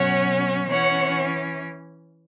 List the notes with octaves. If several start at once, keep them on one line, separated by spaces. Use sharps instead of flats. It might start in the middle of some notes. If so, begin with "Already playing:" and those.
Already playing: B2 F#3 C#4 C#5 F#5
E3 C#4 C#5 F#5